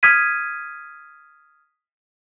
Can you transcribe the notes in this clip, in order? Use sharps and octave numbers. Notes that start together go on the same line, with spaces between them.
D#6 F6 G#6 B6 D#7